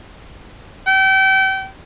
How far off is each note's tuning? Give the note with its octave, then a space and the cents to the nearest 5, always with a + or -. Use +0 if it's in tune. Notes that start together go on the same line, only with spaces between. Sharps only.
G5 -35